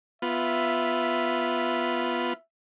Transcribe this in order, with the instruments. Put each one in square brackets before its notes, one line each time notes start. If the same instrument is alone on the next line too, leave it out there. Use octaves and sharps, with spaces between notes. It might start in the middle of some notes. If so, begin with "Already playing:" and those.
[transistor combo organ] B3 F4 [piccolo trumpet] E5